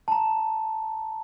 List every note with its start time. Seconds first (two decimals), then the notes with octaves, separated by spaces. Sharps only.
0.08 A5 A#5